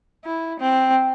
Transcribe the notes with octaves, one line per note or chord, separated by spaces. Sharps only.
E4
C4